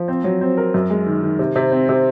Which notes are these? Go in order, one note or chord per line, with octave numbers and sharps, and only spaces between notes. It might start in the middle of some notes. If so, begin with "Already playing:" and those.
Already playing: F3
C4
F#3
C4
A#4
F#2
G#3
D#3
D#3
C3
C3
C4
C3